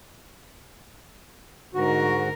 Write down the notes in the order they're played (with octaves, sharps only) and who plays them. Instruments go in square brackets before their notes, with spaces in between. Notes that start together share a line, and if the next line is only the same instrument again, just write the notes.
[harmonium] G#2 F#4 [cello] D3 A#4